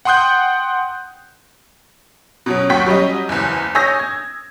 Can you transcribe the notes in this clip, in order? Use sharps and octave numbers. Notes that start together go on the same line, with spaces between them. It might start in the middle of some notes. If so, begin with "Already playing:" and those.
F#5 G5 C6 D#6 F#6 G6
B2 F#3 C#4
D#2 F#3 F#4 G5 C#6 B6
F#3 G3 C#4 D#5
F#1 E2
C#5 G#5 D#6 E6 G6 A#6
G#6